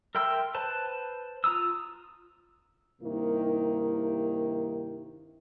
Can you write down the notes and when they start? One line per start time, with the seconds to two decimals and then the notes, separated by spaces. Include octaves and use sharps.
0.15 A#4 E5 G5 C6 E6
0.55 B4 C5 A5
1.44 F4 A#5 D#6 E6
3.02 G2 C3 D#3 A#3 D#4 E4